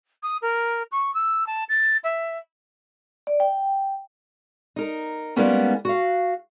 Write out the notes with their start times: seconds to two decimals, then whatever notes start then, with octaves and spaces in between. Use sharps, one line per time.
0.22 D#6
0.41 A#4
0.91 C#6
1.14 E6
1.46 A5
1.68 A6
2.03 E5
3.27 D5
3.40 G5
4.76 D#4 A#4
5.36 G3 G#3 A#3 B3 C#4 D#4
5.85 F#4 F5